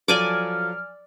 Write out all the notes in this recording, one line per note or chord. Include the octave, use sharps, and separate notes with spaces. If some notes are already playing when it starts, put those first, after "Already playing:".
F3 F#3 A4 D5 G#5 D6 F6